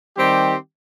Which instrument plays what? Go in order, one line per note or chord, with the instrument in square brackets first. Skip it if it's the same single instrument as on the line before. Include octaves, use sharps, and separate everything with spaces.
[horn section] D#3 G3 C4 G4